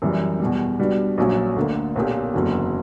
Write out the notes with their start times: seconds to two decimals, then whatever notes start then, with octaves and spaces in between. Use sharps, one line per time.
0.02 F#2 E3 G3
0.40 E2 B2 G3
0.79 B2 G3 B3 D4 F#4
1.18 A#1 A#2 F#3 C#4
1.56 D2 D3 A#3
1.96 B1 A#2 A#3 C#4 G4
2.34 F#1 E2 D3 F#3